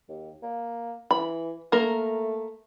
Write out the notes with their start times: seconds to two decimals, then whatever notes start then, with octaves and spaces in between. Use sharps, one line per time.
0.09 D#2
0.43 A#3
1.11 E3 B5
1.72 A3 A#3 A#4